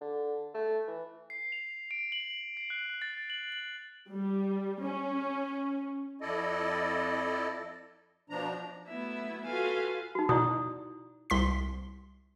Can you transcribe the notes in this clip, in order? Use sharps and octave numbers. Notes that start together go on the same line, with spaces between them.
D3
A3
E3
C7
F7
D7
F#7
C7
F#6
A6
F#7
F#7
G3
C#4
F2 E4 A4 D5 D#5
B2 F3 D4 A#5
F#3 A3 B3 E4 E5
F4 F#4 A4 B4 F5 G#5
D#4 F#4
B2 E4 D5 D#6
C2 C6 B6